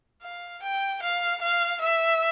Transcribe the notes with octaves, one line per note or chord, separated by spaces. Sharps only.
F5
G5
F5
F5
E5